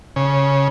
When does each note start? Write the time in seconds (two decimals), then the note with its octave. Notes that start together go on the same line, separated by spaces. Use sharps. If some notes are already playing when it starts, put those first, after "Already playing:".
0.16 C#3